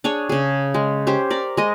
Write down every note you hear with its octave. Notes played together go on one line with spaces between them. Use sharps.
D4 G#4 C#5
C#3 G#4
G#3
C#4 G4 C5
A#4 D5
G#3 D#5